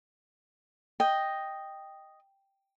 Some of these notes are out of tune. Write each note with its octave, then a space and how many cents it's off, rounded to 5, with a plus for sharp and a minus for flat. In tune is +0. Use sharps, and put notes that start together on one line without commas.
D#5 +0 G5 +0